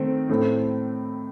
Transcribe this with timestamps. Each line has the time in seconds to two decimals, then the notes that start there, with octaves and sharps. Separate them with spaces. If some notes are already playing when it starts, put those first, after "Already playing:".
Already playing: D#3 A3 C4
0.29 A2 A3 C4